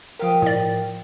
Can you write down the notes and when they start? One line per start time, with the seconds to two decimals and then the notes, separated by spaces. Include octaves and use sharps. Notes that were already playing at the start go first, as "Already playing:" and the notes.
0.19 F3 G4 A#4 F5 D#6
0.42 A2 D5